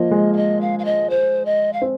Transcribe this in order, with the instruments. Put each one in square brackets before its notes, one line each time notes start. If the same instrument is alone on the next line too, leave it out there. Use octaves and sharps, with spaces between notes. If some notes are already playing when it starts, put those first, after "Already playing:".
Already playing: [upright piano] F3 A#3 [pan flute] D#5
[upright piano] G#3
[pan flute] F5
D#5
F5
F5
D#5
C5
D#5
F5
[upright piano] C4